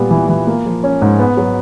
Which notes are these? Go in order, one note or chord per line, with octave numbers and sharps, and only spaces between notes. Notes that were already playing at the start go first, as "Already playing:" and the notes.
Already playing: A#2 G3 B3
E3
E3
A#3
F3
C#4
G#2
B3
F#3